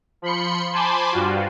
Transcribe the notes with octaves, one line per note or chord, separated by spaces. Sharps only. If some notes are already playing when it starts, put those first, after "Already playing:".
F3 B5 C6 C#7
C5 G#5 A5 B5 C6 D6
G2 G3 F4 F#4